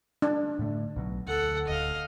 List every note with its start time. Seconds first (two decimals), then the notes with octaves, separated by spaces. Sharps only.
0.22 D4
0.59 A2 D3 A3
0.96 B1 B2 F#3
1.27 D2 A4 F#5
1.67 D1 D2 D#5 F5